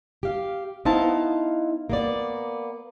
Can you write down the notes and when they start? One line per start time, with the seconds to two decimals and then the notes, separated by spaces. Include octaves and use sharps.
0.23 G4 F5
0.85 B3 D#4 E4 C5 F5 A5
1.90 A#3 B3 D5